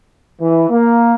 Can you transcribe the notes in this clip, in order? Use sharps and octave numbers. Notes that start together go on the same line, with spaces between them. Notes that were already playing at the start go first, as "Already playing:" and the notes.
E3
A#3